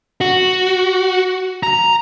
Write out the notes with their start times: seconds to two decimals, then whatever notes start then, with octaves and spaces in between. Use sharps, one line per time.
0.21 F#4
1.63 A#5